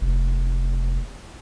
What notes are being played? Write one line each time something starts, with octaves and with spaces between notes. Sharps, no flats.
F1